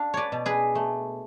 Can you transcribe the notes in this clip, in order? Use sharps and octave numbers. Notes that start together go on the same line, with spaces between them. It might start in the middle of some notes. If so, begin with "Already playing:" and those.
Already playing: D4 F5
B4 C#5 D5
B2
G#4 B4
A3